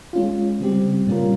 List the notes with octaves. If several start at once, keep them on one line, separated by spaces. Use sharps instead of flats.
G#3 C#4 F4
C#3 G3 C4 G4
A#2 G3 C#4 F4 A#4